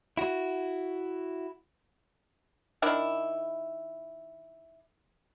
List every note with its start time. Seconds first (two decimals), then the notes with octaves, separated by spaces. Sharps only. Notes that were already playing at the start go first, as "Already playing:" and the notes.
0.17 E4 F#4
2.82 D#3 D4 E4